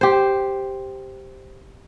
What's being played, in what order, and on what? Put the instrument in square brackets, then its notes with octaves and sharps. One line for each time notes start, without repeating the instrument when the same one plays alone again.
[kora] G4 C5